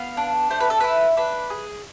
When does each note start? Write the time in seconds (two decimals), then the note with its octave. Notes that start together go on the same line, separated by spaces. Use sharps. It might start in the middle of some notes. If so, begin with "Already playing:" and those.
Already playing: B3 F5
0.17 D4
0.50 A3 C5
0.60 B4
0.70 A4
0.80 E4 B4
1.17 D4 B4
1.50 G#4